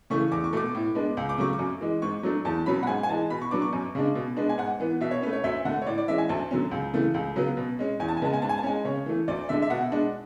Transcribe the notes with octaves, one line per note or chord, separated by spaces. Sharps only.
C#3 E3 A3 C#6
E2 D6
C#6
B2 A3 D6
A2
G#3 B3 D4
C#2
D6
C#3 F#3 A3 C#6
D6
F#2
E3 G#3
G#2 C#6
F#3 A3 D4
E2 A5
B2 F#3 C#4 B5
F#5
G#2 G#5
G#5
E3 G#3 A5
B2 B5
C#6
F#3 B3 D4 D6
C#6
F#2
C#3 G#3 D4
B2
G#3 B3 D4
G#5
G#2 F#5
E3 B3
B2 E5
C#5
A3 C#4 B4
C#5
D2 E5
D3 A3 F#5
C#5
A2 D5
D5
E3 G#3 C#4 E5
G#5
D2 A5
D3 F#3 C#4
C#2
C#3 E3 A3
C#2
C#3 F#3 B3
B2
G#3 C#4
E2 G#5
A5
G#5
C#3 G#3 B3 A5
G#5
G#2 A5
G#5
A5
G#3 C#4 G#5
C#3 C#5
E3 A3
D2 D5
D3 G#3 D4 E5
E5
B2 F#5
G#3 D4